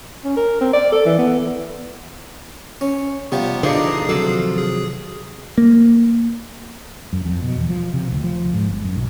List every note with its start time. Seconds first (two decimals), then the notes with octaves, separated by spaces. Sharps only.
0.25 C#4
0.37 A#4
0.61 C4
0.73 D5
0.92 A4
1.06 E3
1.19 B3
2.81 C#4
3.32 C3 F3 G3 B3
3.63 D3 E3 F3 D4 D#4 G#4 C7
4.09 C3 D#3 F3 F#3 A4
4.58 G#4
5.58 A#3
7.13 F#2
7.25 F2
7.43 B2
7.56 E2
7.69 F3
7.93 C3
8.12 D2
8.24 F3
8.54 G#2
8.68 G1
8.84 F#2
8.96 B1